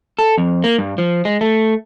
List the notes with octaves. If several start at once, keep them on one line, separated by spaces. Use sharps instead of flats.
A4
F2
A#3
G2
F3
G#3
A3